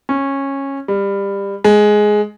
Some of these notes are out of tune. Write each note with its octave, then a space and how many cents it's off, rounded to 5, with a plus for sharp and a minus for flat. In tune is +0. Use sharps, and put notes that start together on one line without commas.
C#4 -15
G3 +20
G#3 +10